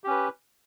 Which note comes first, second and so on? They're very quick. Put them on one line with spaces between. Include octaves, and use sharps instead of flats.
G4 C#4 B4